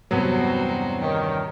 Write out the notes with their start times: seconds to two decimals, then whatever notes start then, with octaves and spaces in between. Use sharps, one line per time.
0.11 E2 G2 C3 F#3 B3 F#4 C5
1.01 D#3 G4 C#5